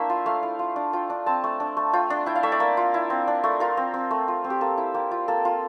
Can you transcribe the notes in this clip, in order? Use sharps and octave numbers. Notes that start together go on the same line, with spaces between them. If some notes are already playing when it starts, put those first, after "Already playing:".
Already playing: A3 A#3 D4 E4 C5 E5
F4
A3 F5
E4
F4
D4
F4 G5
D4
C4 A5
A3
D4
A3
F4 G5
D4
E4 G5
F5
A3 E5
D5
A#3
F4
E4
C4
D4
A3
F4 A#4
C4
C4
A3
F4
C4
G4
A#3 A4
E4
A#3 G4
F4
A#3 A4
F4